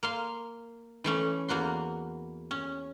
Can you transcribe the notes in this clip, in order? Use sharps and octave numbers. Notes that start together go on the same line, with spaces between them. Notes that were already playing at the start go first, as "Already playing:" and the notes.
A#3 F5 C6
E3 A3 C#4
E2 A#3 F#4 C6
C#4